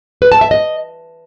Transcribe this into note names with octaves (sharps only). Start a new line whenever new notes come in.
B4
A5
E5
D#5